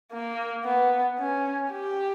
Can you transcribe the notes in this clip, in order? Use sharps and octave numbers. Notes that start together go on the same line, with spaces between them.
A#3
B3
C#4
G4